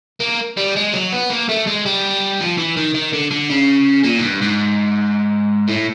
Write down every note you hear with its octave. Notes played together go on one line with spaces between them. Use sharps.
A#3
G3
G#3
F#3
B3
A#3
A3
G#3
G3
F3
E3
D#3
D#3
D3
D3
C#3
A#2
G#2
G2
G#2
A2